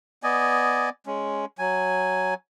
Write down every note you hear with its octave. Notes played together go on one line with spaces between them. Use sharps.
B3 D5 D#5 G#5
G#3 C#4
F#3 G#5